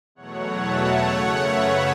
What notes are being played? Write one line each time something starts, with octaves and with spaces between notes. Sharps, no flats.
E2 B2 F#3 A3 C#5 F#5
E5 A5
F#2 C#3 A3 C#5 F#5
B4 E5